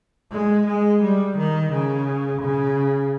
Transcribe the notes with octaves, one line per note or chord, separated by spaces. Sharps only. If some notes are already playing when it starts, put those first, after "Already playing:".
G#3
G#3
G3
D#3
C#3
C#3